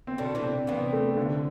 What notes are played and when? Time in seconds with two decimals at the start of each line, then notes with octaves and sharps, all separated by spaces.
0.07 C4
0.18 B2 D3 D4
0.35 C3 E3
0.43 C4
0.67 C3 E3 B3
0.93 A3
1.17 D3